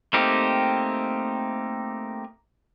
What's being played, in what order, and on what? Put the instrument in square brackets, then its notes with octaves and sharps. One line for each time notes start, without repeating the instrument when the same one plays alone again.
[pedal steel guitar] A3 A#3 C4 D#4 G4